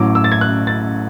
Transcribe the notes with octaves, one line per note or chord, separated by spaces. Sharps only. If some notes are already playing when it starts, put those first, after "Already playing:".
Already playing: A1 A2 F#3 D6
E6
A6
G#6
F#6
A6